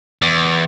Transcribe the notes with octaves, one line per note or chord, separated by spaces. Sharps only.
E2